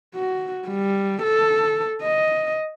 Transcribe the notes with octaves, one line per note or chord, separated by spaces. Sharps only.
F#4
G3
A4
D#5